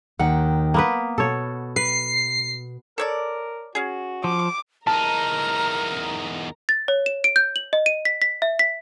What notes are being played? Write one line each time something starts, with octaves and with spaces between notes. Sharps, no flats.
D#2 D#3 F#5 G5
A#3 B3 B4
B2 A4 C#5
B4 C7
A4 A#4 C#5 D5
C#4 F#4 G#4
F3 D6
E2 D#4 A#4 A5 A#5 F6
A6
C#5
E7
D7
G6
F#7
D#5
D#7
B6
B6
E5
B6